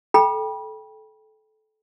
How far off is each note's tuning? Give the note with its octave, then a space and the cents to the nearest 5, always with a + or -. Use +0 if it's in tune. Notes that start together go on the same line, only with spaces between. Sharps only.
A4 -20 G5 +10 B5 -30